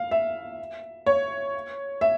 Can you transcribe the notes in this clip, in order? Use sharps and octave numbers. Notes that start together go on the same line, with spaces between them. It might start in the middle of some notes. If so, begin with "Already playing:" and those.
Already playing: F5
E5
C#5
E5